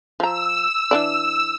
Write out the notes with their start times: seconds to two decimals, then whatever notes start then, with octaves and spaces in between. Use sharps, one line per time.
0.20 F3 A#5 E6
0.91 E3 D4 D5